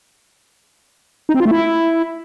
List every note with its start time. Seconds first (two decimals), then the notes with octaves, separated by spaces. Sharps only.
1.29 D#4
1.34 C4
1.40 F4
1.46 A3
1.51 E4